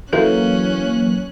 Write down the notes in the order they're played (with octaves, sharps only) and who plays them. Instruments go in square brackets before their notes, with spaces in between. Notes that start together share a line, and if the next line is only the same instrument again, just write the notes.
[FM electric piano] E3 F#3 A#3 [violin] C#4 F#6 [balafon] A4 A#4 E5